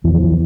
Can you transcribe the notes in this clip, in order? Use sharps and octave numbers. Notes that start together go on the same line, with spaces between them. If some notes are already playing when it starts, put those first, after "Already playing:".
E2 E3
F3
E3